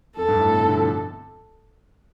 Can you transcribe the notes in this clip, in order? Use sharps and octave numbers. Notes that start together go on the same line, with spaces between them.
F2 A4
G2
A2
B2
C3
D3
F3